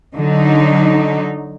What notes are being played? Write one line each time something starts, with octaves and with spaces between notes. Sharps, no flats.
D3 F#3 D#4